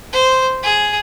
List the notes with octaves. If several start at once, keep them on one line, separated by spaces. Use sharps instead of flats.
C5
G#4